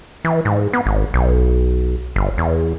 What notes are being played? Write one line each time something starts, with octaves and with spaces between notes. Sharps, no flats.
E3
G#2
B3
G#1
B1
G1
E2